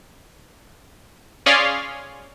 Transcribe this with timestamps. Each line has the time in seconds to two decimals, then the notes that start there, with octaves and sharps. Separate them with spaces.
1.46 C#4 G#4 C#5 D5 F5 C6